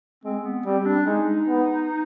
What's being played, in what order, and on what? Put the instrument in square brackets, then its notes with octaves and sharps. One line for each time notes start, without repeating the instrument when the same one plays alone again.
[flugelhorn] G#3 [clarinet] C4
[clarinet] B3
[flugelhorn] G3 [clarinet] C4
[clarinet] D4
[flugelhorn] G#3 [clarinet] D#4
[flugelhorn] B3